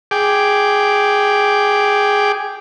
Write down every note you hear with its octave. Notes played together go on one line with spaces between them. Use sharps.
G#4 G5 D6